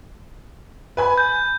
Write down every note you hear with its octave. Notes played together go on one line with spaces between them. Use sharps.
B4 G#5 B5
G6